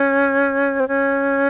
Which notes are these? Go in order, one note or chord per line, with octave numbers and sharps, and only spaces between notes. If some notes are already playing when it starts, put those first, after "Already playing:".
Already playing: C#4
C4
C#4